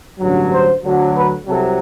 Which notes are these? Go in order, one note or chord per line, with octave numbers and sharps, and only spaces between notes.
A1 G2 D3 F#3
C5
D2 D3 F#3
B4
C2 C3 F#3 A4